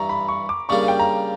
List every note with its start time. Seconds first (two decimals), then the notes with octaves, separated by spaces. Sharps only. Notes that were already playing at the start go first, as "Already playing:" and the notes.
Already playing: G2 E3 G3 A#5 C#6
0.09 B5
0.28 C#6
0.49 D6
0.69 C#3 G3 A#3 D4 C#6
0.88 G5
0.99 A#5